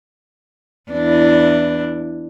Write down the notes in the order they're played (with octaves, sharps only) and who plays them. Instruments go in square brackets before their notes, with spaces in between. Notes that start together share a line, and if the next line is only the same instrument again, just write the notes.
[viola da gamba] E2 D4 E4